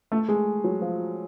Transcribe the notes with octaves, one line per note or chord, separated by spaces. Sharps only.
A3
G#3
F#3
F3